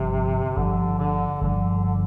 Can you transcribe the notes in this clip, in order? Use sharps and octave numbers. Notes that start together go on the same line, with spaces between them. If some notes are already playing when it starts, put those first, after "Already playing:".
Already playing: G1 G2 C3 F3
G1 G2 D3 F3
D3
G1 G2 D3 F3
D3